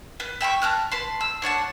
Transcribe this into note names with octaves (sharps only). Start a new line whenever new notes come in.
B4
E5 G5 C6 C#6
A5 A#5 F6 F#6
B4 A5 C6
E6
D4 C#5 F#5 A5